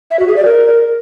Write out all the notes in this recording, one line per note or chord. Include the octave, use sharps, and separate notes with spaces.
E5
F#4
G#4
D5
A#4